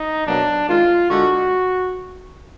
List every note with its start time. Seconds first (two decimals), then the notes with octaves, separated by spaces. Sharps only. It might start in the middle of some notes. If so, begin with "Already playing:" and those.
Already playing: D#4
0.25 B2 F#3 A#3 D4
0.67 D#3 G#3 F4
1.09 D3 G#3 F#4